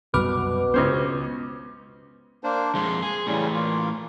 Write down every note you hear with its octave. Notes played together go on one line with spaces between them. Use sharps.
C2 F#2 B2 G3 B4 D6 F6
C#2 B3 C#4 C5
A#3 D4 C5
F2 G#3 C6
G#4
A2 C#3 E3 G3 C#4
A#3 F4